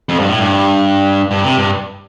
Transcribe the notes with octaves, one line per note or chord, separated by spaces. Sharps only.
F2
G2
A2
G2
G2
C3
G2